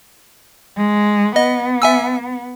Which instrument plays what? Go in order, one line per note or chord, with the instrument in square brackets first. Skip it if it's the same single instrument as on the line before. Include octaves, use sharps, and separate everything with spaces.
[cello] G#3
[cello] B3 [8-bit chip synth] D#5
[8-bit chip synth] E5 G#5 E6